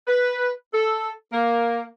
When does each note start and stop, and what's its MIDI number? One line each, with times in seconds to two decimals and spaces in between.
0.07 0.49 71
0.74 1.09 69
1.33 1.85 58